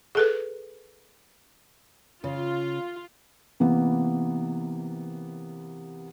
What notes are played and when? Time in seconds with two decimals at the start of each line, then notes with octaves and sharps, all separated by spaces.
0.15 G#4 A4 B4
2.24 C#3 F4
3.60 C3 E3 A#3 B3